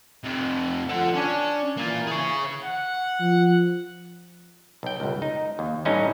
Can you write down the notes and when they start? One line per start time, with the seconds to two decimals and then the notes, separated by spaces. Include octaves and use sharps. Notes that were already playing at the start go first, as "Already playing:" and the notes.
0.24 F2 C3
0.89 F3 A4 F#5
1.15 C#4 D4
1.77 E3 A#3 F4
2.07 G#4 C#5
2.64 F#5
3.20 F3
4.83 B1 G5
5.00 G1 C#2
5.22 D#4
5.59 D#2
5.85 A1 G2 D3 C#4 D#4 E4